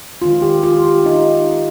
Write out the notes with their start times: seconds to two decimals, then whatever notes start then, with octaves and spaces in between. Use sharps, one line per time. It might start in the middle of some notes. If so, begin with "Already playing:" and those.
0.22 D#3 G#3 F4
0.42 G4
0.63 F4
0.85 G4
1.06 D#4